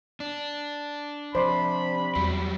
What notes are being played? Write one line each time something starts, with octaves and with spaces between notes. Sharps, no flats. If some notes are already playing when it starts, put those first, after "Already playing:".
D4
C3 F3 C5 D5 B5 C6
E2 F#3 G3